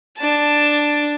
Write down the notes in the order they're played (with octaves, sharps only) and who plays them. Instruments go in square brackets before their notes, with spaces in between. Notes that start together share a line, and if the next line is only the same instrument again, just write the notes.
[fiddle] D4 A5